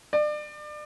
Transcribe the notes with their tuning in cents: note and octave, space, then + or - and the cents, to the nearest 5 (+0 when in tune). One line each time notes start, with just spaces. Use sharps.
D5 +35